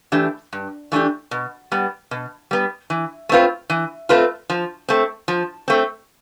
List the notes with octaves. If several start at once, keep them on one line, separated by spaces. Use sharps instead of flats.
E3 A3 D4 G4
G2
E3 A3 D4 G4
B2
G3 B3
B2
G3 B3
E3
A3 C4 F4 B4
E3
A3 C4 F4 B4
F3
A3 C4
F3
A3 C4